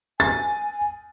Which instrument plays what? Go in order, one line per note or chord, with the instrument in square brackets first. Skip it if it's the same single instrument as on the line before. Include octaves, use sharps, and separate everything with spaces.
[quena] G#5 [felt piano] A6